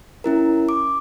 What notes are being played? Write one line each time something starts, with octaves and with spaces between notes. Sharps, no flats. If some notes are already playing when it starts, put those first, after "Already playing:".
C#4 E4 A#4
D6